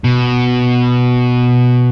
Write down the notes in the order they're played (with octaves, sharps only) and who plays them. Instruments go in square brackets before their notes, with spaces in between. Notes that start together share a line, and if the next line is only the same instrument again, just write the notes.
[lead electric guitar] B2